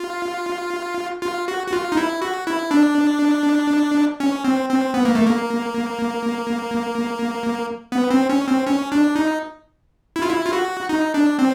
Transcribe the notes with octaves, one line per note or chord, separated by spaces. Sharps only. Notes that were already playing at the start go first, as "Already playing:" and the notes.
Already playing: F4
F4
F#4
F#4
F4
D#4
E4
F#4
E4
D4
C#4
C4
C4
B3
A#3
A3
A#3
B3
C4
C#4
C4
C#4
D4
D#4
E4
F4
E4
F4
F#4
D#4
D4
C4